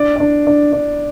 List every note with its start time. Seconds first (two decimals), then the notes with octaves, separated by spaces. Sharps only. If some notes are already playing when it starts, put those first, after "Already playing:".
Already playing: D4 D5
0.16 D4 D5
0.47 D4
0.73 D4